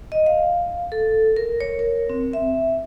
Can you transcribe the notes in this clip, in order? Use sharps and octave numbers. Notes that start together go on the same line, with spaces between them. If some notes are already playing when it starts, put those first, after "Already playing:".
D#5
F5
A4
A#4
C#5
A#4
C4
E5